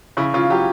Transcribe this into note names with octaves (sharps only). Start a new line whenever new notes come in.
C#3 E4
C#3 F4
F#3 G4